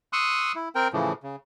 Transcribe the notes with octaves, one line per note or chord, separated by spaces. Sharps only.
C6 C#6 D#6 E6 F#6
E4
C4 A#4 G5
A2 C#3 E3 F3
C#3